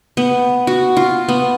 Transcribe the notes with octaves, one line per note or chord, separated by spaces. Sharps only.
B3
F#4
F4
B3